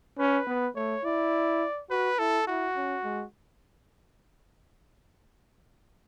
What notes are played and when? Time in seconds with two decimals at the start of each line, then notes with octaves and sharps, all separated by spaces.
0.19 C#4 B4
0.47 B3
0.76 A3 C#5
1.05 E4 D5
1.90 F#4 B4
2.19 E4 A4
2.47 E4 F#4
2.76 C#4
3.04 G#3